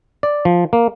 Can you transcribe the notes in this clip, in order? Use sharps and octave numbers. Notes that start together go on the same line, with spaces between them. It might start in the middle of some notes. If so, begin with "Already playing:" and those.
D5
F3
A#3